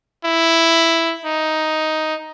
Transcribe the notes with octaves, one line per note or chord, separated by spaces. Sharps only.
E4
D#4